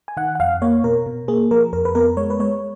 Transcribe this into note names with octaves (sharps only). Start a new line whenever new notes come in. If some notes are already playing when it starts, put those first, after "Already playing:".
G#5
D#3 F#5
F#5
F2 F5
A#3 C#5
B2 A#4
B2
A#3 G#4
F3 A#4
F2 A#4
B4
B3 A#4
G#3 C#5
B4
G#3 C#5